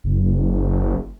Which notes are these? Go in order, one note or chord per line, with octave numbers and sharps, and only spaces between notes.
F#1